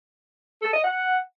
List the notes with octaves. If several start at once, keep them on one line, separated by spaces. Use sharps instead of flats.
A4
D#5
F#5